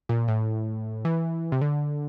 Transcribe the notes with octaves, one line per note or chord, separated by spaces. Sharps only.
A#2
A2
E3
C3
D3